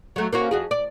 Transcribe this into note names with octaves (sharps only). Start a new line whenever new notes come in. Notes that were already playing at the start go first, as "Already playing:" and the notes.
F#3 A3
A#3 C#4 F#4
F2 F#4 G#4
D5